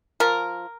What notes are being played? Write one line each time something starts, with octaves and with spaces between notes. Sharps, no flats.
F3 A#4